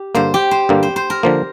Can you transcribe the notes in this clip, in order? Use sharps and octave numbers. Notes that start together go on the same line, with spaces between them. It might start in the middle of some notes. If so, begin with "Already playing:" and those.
Already playing: G4
G2 D3 A#3 C5
G4
C5
G2 D3 A#3
C5
C5
A#4
D3 F3 A#3